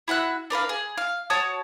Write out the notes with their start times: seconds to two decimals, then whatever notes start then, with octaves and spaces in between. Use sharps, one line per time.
0.08 E4 F#4 E5 F#6
0.50 D4 A#4 B4 F5
0.69 G#4
0.98 F5
1.30 F#4 C#5 A5 D#6